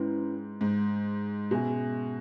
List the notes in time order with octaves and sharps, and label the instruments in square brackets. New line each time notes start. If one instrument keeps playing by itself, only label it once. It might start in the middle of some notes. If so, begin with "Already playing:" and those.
Already playing: [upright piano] G#2 [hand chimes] C#4 E4 B4
[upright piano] G#2
[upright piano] B2 [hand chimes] C#4 G#4 E5 G#5